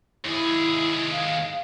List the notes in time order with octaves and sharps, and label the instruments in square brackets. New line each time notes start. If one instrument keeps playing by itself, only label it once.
[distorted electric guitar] D#2 G#4 [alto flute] E4
[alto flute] F5